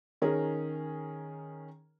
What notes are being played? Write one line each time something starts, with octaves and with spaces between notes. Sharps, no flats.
D#3 C#4 G#4 A#4